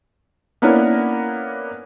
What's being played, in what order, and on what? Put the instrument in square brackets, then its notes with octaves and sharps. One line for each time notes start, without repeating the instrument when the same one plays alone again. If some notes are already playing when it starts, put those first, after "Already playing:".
[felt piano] A#3 B3 C#4 D4 E4 A#4